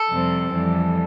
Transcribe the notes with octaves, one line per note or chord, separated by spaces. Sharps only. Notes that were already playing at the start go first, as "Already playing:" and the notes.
Already playing: A4
F2 C3 G3 C4
F2 E3 G3